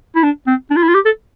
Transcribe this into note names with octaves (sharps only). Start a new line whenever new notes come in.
E4
D4
C4
D4
F4
E4
F4
G4
A4